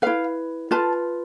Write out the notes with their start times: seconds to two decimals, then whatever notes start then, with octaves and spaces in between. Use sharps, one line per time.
0.02 E4 B4 F5
0.71 F4 B4 A5